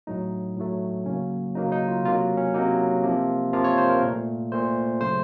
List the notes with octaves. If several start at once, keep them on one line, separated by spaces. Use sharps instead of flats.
A2 F#3 A3 D#4
A2 F#3 A3
C#3 F#3 A#3 C#4
C#3 F#3 A#3 D#4
D#4
F4
C3 F#3 A#3 F4
C#4
C3 F#3 A#3 D#4
C3 F3 A#3
C3 F3 A#3 F4
C#5
C5
A#4
A#2 A3
A#2 A3 C5
C#3 F#3 A3 C5